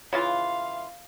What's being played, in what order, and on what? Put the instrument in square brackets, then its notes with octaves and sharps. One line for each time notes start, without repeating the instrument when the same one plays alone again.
[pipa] C#3 E3 F4 [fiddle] F5